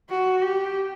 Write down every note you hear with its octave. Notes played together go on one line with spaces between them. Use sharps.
F#4
G4